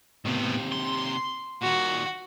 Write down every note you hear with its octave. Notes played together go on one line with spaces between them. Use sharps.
D#2 A2 C3 B3
C6
A#2 D#3 F#4